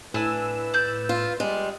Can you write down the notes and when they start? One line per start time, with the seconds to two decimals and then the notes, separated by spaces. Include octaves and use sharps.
0.14 A2 D4 E4 B4 G#5 E6 E7
0.74 D5 G6
1.09 F4
1.40 G3 G#3